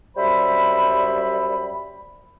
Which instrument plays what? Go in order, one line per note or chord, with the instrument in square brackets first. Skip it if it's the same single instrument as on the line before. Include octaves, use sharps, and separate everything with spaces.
[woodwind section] F#2 G3 C5 E5 B5